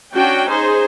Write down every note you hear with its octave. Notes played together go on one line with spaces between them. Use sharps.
C#4 D4 F#4 G5
D#4 G#4 C5